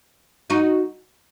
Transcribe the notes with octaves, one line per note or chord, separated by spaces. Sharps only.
D#4 F#4